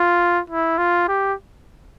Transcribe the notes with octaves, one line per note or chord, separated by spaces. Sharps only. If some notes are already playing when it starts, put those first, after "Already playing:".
Already playing: F4
E4
F4
G4